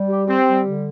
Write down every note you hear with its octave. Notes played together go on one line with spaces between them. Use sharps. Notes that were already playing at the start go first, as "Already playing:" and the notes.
Already playing: G3
G4
C4 G4
G3
D3